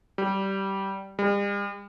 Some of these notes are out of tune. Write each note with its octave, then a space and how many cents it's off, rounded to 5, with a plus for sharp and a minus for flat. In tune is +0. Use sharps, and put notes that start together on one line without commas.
G3 -15
G3 +45